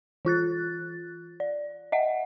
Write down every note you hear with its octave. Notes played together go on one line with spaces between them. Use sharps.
E3 F4 F#6 A6
D5
D#5 E5 F#5